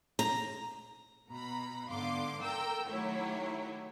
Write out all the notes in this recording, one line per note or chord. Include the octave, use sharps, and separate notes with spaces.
A#5
B2 A#5 B5
G#2 D3 B3 F5 C6 D6
A4 A#4 G5 A#5 E6
D#3 F#3 A3 E4 G4 C#5